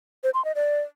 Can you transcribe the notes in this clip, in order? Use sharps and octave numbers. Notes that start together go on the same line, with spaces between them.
C5
C6
D#5
D5